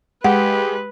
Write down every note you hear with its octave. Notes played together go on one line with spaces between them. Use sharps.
G#3 G4 B4 F#5